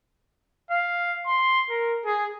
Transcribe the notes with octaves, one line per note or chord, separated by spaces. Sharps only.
F5
C6
A#4
G#4